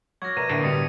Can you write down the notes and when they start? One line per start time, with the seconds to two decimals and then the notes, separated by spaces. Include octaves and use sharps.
0.22 F#3 C#6 D6 F6 G#6 A#6
0.37 C3 A#4 B4 D5 A#5 D#7
0.49 A2 D3 A#3 D7
0.61 B2 G3 G4 D#6 A6 B6 C#7